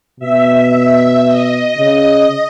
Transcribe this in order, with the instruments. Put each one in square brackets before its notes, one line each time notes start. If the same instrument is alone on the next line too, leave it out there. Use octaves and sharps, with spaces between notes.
[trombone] B2 [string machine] E5
[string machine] D#5
[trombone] C#3 [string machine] D#5